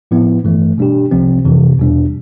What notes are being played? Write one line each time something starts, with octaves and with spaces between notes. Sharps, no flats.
A2 F3 B3 E4
G2 E3 A3
B2 G3 D4 G4
C2 C3 F3 C4
F2 C3 E3
E2 B2 G3 D4